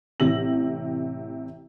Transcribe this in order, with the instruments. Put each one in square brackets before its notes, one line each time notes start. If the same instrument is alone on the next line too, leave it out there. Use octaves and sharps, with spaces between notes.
[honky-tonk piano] A1 C3 E6 A#6 F#7